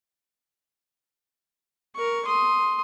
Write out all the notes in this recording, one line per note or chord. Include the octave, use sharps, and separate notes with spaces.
A#4 C#6
C6 D#6